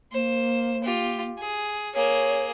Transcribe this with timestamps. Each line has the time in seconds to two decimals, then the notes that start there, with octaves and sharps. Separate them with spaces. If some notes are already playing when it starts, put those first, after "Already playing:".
0.12 A#3 C5
0.84 F4 G4
1.38 G#4
1.95 A#3 G#4 C#5